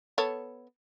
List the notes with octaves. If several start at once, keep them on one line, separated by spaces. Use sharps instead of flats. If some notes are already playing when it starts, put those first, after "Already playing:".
B3 A4 C#5